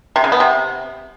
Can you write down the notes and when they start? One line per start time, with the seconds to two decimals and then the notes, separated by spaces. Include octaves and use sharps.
0.16 C3
0.24 C#3
0.32 B3
0.40 C3